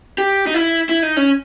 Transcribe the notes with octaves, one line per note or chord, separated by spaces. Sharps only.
G4
D#4
E4
E4
D#4
C#4